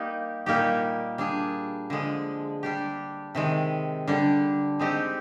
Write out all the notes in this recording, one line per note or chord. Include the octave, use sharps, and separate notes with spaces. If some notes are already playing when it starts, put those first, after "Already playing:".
Already playing: G3 A#3 D#4 G4
A#2 G3 A#3 D#4 G4
G3 D4 G#4
D3 F3 G#3
G3 D4 G4
C3 D#3 G#3
D3 G3 D4
G#3 C4 D#4 G4